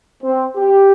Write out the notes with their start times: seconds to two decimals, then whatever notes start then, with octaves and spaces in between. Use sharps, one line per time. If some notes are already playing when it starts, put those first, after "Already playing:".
0.24 C4
0.57 G4